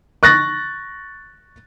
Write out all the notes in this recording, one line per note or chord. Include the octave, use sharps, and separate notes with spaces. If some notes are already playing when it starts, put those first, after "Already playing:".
C#6 F#6 A6 A#6